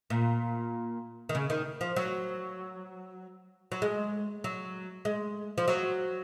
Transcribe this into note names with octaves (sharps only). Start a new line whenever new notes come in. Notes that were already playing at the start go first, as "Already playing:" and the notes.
A#2
D#3
C#3
D#3
F3
F#3
F#3
G#3
F#3
G#3
F3
F#3